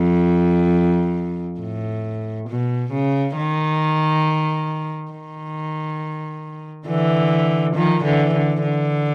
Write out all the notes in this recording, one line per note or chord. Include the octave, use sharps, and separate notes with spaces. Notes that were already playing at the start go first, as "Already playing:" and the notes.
Already playing: F2
A2
B2
C#3
D#3
D#3
D3 E3
D#3 F3
D3 E3
D3
D3